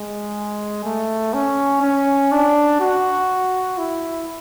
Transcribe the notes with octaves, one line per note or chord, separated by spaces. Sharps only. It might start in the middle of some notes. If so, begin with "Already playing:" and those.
Already playing: G#3
A3
C#4
C#4
D4
F#4
E4